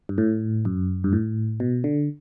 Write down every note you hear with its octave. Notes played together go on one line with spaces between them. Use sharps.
G2
A2
F#2
G2
A2
B2
D3